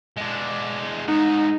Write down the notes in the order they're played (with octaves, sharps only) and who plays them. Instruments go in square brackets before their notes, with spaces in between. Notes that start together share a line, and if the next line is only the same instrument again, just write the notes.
[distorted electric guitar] G#3 D4
[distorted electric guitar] G#2 F#4 [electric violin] D#4